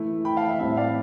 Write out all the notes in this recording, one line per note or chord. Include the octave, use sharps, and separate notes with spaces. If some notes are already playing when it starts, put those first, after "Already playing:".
Already playing: E3 A3 E4
G5 B5
F5 A5
E5
A2 G3 C4 E5
D5 F5